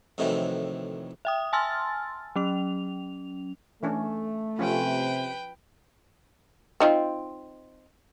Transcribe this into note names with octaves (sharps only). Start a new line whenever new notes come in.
F2 A2 C3 D#3 E3 F#3
E5 G5 D#6
G#5 A5 C6 E6 F6 A6
F#3 C#4 F7
E3 A3 C#4 D4
C3 F3 C#4 F4 B4 G5
C4 D#4 F4